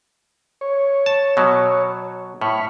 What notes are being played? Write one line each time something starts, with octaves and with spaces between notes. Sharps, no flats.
C#5
A5
B2 F#3
A2 B5 C#6 F6